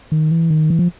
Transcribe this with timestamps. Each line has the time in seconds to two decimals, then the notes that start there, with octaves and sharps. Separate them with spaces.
0.12 D#3
0.31 E3
0.50 D#3
0.70 E3
0.79 F3